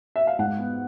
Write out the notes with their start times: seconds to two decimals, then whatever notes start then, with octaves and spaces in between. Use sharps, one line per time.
0.16 E5
0.27 F5
0.39 G#2 F#5
0.58 B3